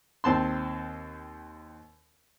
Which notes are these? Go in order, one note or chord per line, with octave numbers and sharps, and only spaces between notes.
D#2 C4 A5 C6